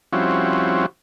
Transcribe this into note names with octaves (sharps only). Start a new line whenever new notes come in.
F3 G3 C4 C#4 E4 F#4